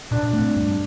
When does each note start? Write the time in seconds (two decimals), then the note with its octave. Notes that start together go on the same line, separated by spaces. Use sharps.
0.11 A#2 D4
0.33 A3 C4
0.56 G2